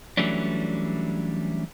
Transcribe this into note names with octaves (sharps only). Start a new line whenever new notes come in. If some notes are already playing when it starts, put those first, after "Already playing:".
E3 F#3 G3 A3 C#4 D4